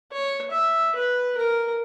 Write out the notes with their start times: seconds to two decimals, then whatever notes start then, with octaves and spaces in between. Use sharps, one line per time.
0.12 C#5
0.51 E5
0.95 B4
1.37 A#4